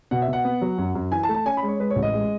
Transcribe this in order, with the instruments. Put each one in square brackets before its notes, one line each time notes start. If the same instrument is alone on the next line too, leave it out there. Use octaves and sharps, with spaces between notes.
[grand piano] B2 F#5
E5
B2
F#5
B3
F#3
F#2
F#2
E3 G#5
A5
A3
A5
C#4 G#5
B5
G#3
C#5
G#3 B4
C#5
A1
D#5
G#3